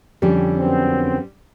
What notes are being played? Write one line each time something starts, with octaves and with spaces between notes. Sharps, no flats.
F2 D3 G3 C#4
F#2 B3 C4